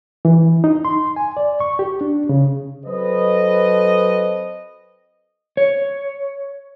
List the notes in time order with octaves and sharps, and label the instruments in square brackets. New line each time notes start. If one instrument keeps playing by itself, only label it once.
[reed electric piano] E3
D#4
C6
G#5
D5
C#6
G4
D4
C#3
[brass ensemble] F#3 C4 A4 B4 C5 D#5
[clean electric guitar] C#5